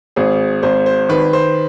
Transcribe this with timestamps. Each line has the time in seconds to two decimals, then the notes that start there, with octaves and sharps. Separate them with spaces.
0.16 G#1 G#4
0.63 G#1 C5
0.86 C5
1.09 D#3 B4
1.33 C5